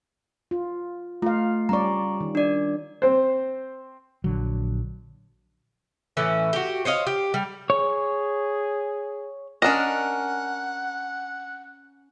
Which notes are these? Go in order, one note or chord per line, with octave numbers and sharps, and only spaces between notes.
F4
A3 F4 F5
G3 C#4 D5 A#5 C#6
D#3
D4 D5
C4 C5
A#1 D3 F#3
A2 E3 C#4
F#4 G4
C5 C#5 D#5 F5
G4
G3
G#4 C#5
C#4 D4 A#4 D#5 F#5